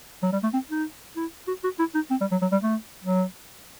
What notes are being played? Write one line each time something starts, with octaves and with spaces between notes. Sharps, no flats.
F#3
G3
A3
C4
D#4
E4
F#4
F#4
E4
D#4
C4
G3
F#3
F#3
G3
A3
F#3